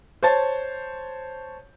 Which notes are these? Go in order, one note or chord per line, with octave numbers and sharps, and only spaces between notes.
C5 C#5 A5 A6